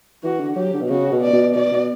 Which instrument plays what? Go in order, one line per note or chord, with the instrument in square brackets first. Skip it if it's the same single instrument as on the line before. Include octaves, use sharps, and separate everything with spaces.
[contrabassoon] E3 [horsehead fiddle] F#4
[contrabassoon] D3
[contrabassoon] F#3 [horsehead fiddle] G4
[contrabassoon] D3
B2
[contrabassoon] C#3 [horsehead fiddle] F#4
[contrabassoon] B2
[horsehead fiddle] D5
[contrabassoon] B2
[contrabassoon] B2 [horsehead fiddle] D5
[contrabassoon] B2